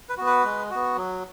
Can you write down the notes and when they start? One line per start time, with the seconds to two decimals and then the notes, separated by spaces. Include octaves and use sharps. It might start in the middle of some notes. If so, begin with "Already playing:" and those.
0.09 B4
0.17 B3 F#4
0.26 B4
0.44 G#3
0.70 B3 F#4
0.97 F#3